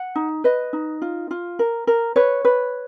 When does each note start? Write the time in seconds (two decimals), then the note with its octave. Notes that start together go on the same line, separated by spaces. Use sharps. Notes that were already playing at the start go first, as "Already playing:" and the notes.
Already playing: F#5
0.15 D#4
0.44 B4 D#5
0.73 D#4
1.02 F4
1.31 F4
1.59 A#4
1.87 A#4
2.16 B4 C#5
2.45 B4